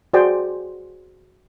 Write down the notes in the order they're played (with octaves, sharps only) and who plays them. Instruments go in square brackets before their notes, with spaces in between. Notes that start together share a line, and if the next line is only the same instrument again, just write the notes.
[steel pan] F#4 G#4 C5 D5 G5